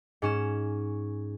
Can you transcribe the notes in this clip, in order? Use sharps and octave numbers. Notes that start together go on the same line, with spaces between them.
G#2 C#4 E7